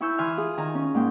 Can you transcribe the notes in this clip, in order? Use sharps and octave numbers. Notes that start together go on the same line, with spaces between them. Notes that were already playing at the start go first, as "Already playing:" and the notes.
E4 G#5 C#6 E6 G6
E3 G#5 C6 F6
F4 G#4
D#3 G#5 A#5
C#4
G#2 A#3 G5